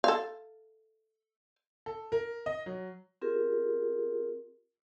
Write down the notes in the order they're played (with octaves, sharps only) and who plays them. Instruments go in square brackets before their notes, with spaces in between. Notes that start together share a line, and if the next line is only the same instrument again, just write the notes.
[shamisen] A4 F5
[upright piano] A4
A#4
D#5
F#3
[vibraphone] C4 F4 G4 G#4 A#4